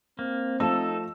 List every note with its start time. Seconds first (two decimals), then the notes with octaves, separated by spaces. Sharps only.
0.19 A#3 C4
0.60 F3 A3 D#4 A4 E6